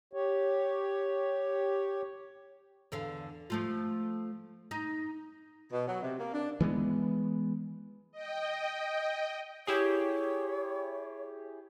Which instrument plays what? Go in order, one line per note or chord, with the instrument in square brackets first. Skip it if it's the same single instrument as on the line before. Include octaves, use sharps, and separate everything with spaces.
[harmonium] G4 C#5
[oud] E2 D3 F5
F3 A3 F4
D#4
[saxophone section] B2
F#3
C3
A#3
D4
[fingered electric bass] E3 G#3 A3 B3
[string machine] D#5 G5
[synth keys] E4 G4 G#4 [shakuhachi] C#5